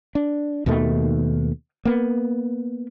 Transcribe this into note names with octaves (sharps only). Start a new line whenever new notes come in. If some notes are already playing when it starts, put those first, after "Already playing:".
D4
D#2 B2 D#3 A3
A#3 B3